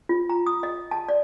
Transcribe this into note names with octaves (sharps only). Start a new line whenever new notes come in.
F4
A#5
D#6
D#5
A5
D5